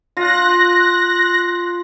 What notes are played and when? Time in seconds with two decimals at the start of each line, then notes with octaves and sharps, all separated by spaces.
0.17 F4 F#6 A#6